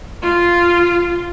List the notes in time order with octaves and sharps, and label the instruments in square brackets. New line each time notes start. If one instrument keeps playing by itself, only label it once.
[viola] F4